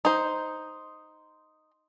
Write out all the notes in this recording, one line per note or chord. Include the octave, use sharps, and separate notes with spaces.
D#4 C5